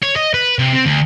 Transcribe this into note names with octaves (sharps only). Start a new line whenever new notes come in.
C#5
D#5
B4
C3
C4
D2